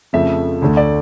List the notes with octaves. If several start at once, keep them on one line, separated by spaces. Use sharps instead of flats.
F2 C#3 F3 A3 E5
D2 D3 A3
D5